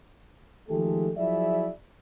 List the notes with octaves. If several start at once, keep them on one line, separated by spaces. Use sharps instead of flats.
D#3 F3 G#3 A3 G4 A4
F3 F#3 E4 G#4 D5 E5